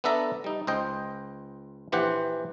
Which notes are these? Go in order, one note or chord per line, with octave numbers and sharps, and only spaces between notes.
B3 D4 A4 E5 A#5
G3 D#4
C#2 C5 D#5 G5
A#1 E3 G4 C5 F#5